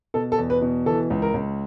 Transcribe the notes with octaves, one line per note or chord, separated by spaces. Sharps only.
B2 A4
A4
E2
B4
B2
E3 A4
C#2
A#4
C#2